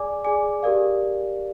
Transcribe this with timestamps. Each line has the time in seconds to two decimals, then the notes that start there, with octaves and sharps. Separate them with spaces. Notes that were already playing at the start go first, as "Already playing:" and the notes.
Already playing: G#4 D5 G#5 D6
0.24 G#4 D5 G#5 D6
0.63 G4 A#4 D5 F5